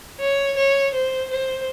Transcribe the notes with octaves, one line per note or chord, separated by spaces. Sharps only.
C#5
C#5
C5
C5